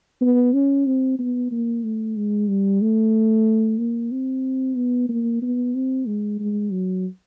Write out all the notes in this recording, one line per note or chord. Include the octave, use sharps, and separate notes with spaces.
B3
C#4
C4
B3
A#3
A3
G#3
G3
A3
A#3
C4
B3
A#3
B3
C4
G#3
G#3
F#3